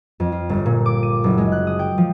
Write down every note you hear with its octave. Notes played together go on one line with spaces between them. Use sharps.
F2
F4
G1
A#2
D6
D#7
F#1
G#3
F#6
D#6
G5
F3